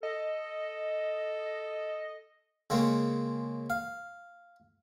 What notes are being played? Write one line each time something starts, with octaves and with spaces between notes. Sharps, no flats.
A4 D#5
C#3 G#3 A#3 C4 C#4
F5